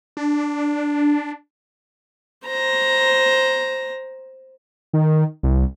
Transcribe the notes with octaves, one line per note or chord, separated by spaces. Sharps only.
D4
C5 A#5
D#3
C2